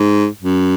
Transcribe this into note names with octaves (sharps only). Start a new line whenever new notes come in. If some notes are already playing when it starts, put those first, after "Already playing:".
Already playing: G#2
F#2